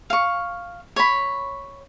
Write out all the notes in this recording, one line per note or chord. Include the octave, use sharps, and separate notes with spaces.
F5 C#6
C#5 B5